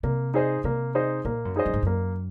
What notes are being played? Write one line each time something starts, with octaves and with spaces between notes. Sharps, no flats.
C3 A#3
D#4 G#4 C5 D#5
C3 A#3
D#4 G#4 C5 D#5
A#2 A#3
F#2
D#4 G#4 C5 D#5
F#2
G#2
F#2 A#3